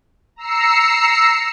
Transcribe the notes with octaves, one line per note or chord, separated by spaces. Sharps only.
A#5 E6 C7 C#7